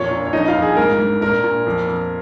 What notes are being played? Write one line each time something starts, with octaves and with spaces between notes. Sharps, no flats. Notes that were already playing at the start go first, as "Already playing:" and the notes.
Already playing: F2 A#2 C#5 C#6
A#2
C#5
F2 D#4 D#5
F4 F5
F2
G#4
G#2 A#4
G#2
A#2 A#4
A#2
F2
F2